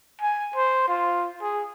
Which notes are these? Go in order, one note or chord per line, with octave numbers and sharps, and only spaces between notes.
G#5
C5
F4
G#4